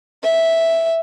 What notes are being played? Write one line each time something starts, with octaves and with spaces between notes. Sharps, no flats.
E5